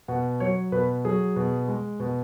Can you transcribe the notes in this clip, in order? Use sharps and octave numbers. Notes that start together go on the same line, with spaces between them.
B2 F#5
F#3 C#5
B2 B4
F#3 G#4
B2
G#3
B2